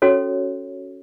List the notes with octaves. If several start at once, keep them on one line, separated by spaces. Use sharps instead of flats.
C#4 F#4 A4 C#5